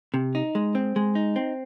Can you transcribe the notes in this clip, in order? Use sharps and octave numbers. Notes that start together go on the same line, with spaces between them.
C3
D#4
G#3
C4
G#3
D#4
C4